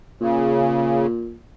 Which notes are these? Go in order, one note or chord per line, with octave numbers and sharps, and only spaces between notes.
A#2 C#3